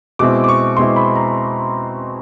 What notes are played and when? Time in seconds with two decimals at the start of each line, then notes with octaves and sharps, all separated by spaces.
0.19 B2 G#3 C4 E4 D6
0.44 D6
0.49 C#6
0.77 B2 G#3 C4 E4 C6
0.96 B5
1.16 A#5